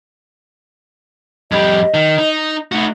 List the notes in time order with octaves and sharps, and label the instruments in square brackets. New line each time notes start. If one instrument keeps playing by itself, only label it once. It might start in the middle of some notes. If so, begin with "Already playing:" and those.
[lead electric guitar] F2 G3 [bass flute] D#5
[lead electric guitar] D#3
D#4
[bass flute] A3 [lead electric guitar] D#4 F#4